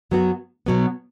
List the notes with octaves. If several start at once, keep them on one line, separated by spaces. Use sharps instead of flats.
F#2 F#3 B3 F#4
B2 F#3 B3